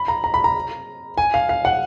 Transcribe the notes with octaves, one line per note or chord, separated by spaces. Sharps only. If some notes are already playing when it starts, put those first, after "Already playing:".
Already playing: B5
A#5
A#5
B5
A#5
G#5
F5
F5
F#5